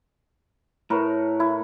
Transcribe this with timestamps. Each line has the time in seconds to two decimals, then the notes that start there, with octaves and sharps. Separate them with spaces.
0.90 A2 A#4 B4 C#5
1.40 E4